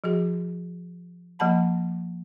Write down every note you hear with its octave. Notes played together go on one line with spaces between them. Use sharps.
F3 F#4 G#4
F3 A#3 F#5 A5 B5